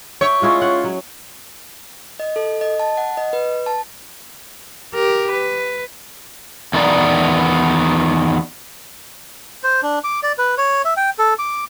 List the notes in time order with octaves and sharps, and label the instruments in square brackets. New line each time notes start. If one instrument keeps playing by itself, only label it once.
[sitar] C#5 [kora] E5 G5
[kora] G#3 C#4 E4 [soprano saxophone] F4
[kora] F#5
F#3
[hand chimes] D#5
A4
D#5
A5
F#5
D#5
B4
A5
[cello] G4 A#4
B4
[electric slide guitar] E2 D#3 B3 D#4 D5
[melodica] C5
D4
D6
D5
B4
C#5
E5
G5
A4
D6